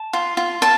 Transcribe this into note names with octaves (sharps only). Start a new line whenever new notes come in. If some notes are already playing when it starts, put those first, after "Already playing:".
Already playing: A5
F4
F4
A5